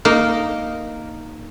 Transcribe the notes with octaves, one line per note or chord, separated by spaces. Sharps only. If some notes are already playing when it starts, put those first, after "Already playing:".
A#3 D#4